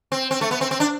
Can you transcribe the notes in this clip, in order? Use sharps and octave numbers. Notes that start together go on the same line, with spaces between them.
C4
C4
A3
B3
C4
C4
D4